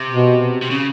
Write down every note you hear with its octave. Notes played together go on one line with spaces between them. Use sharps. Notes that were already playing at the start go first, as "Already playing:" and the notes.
Already playing: C3
B2
C3
C#3